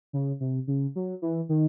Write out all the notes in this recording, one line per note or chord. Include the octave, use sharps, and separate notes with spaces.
C#3
C3
C#3
F#3
E3
D#3